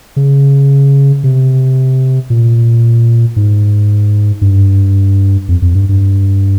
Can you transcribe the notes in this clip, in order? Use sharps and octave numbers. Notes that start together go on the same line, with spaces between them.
C#3
C3
A#2
G#2
G2
F2
F2
G2
G2